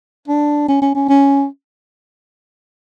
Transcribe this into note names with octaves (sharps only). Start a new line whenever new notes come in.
D4
C#4
C#4
C#4
C#4